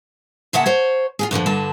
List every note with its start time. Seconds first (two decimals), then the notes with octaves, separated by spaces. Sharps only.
0.53 A#2 C#3 E5 F#5 A5
0.66 C5 C#5
1.19 F4 G4 G#4
1.31 G2 D3 E3 F3
1.46 G2 D3 A5